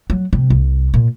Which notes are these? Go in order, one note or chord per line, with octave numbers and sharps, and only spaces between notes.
F#3
C3
C2
A#2